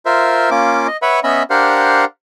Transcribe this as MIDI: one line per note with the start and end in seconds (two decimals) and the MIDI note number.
0.06 0.50 65
0.06 0.50 70
0.06 0.50 72
0.06 0.50 76
0.51 0.87 58
0.51 0.87 61
0.51 0.87 65
0.51 0.87 86
0.87 0.97 75
1.02 1.20 71
1.02 1.20 73
1.02 1.20 76
1.02 1.20 78
1.02 1.20 83
1.24 1.43 59
1.24 1.43 61
1.24 1.43 75
1.24 1.43 76
1.24 1.43 83
1.50 2.05 62
1.50 2.05 67
1.50 2.05 70
1.50 2.05 72
1.50 2.05 77
1.50 2.05 78